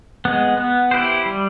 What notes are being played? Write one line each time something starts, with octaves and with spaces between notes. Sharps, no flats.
G#3 B3
B3
E4 G4 C5
G3